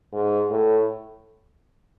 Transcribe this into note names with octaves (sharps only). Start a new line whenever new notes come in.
G#2
A2